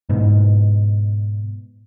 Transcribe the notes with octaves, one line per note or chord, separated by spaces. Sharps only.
G#2 B2